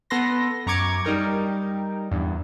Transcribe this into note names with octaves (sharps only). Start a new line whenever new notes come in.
B3 A4 B4 C6 A#6
F#2 A#5 C#6 D6 G#6 C#7
G3 D#4 A#4 G5
E2 G2